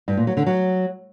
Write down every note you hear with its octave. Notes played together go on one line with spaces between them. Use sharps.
G2
A#2
F#3
D3
F#3